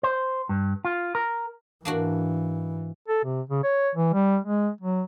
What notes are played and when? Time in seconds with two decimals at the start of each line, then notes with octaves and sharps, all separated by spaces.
0.03 C5
0.49 G2
0.85 F4
1.15 A#4
1.85 G#2 E3 A#3 D4 F#4
3.08 A4
3.25 C3
3.50 C#3
3.63 C#5
3.95 E3
4.13 G3
4.44 G#3
4.81 F#3